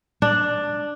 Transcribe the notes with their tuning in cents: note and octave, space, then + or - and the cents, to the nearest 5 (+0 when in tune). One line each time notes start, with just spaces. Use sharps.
D4 +5